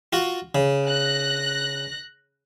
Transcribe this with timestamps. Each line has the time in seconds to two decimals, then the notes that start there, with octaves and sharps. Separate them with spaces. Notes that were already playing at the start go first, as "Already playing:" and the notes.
0.13 F4 F#4
0.55 C#3
0.86 F#6 A#6